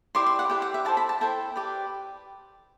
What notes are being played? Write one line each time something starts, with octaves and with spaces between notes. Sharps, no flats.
E4 G4 B4 D5 C6
C6
F#5
E4 G4 B4 D5 G5
F#5
E5
E4 A4 C5 A5
B5
A5
E4 A4 C5 G5
G4 B4 D5